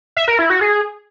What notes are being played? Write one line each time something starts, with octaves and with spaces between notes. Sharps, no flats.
E5
A#4
E4
F#4
G#4